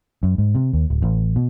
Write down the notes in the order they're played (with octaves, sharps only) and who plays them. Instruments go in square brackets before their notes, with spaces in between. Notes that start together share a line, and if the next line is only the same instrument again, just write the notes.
[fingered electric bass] F#2
G#2
C3
D#2
D1
A1
B2